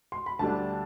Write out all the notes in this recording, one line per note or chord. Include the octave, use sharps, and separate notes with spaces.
C6
B5
D2 D3 G3 D4 A5